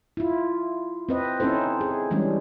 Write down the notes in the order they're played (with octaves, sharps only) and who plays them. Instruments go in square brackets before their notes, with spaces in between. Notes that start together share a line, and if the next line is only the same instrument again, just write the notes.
[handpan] E4 F4
C4 B4 D#5
C4 C#4 D#4 E4 A4 C5
G#4
E3 G3 G#3 C#4 D4